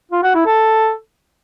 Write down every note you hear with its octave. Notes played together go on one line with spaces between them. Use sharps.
F4
F#4
E4
A4